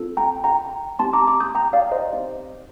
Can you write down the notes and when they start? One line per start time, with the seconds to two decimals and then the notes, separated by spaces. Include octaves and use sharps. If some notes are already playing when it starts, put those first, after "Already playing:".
Already playing: C4 F4 A4
0.17 G5 A#5
0.44 G5 A#5
0.99 C4 D#4 G4 A5 C6
1.13 A#5 D6
1.27 A#5 D6
1.40 D#6 G6
1.55 G5 A#5
1.73 D5 F5
1.91 C5 D#5
2.10 C4 D#4 G4